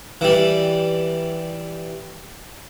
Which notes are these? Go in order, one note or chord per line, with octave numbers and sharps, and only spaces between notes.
E3 G3